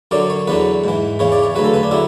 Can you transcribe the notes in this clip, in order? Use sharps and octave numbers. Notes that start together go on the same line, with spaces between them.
F#2 D3 F#3 D5
C#5
E2 D3 F#3 B4
G#2 E3
E2 C#3 E3 C#5
D5
C#5
D2 C#3 F#3 B4
A4
B4
D4
D3 F#3 E4